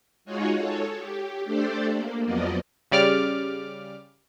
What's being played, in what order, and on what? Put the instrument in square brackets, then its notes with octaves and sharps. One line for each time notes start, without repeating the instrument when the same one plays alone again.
[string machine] G#3 D#4 F4 F#4 G#4 C#5
A4 C#5
G4
A3 D4 G4 A4 C5 D5
A#3
F2 F3 F#3 B3 D5 D#5
[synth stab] C#3 G3 D5 D6 F6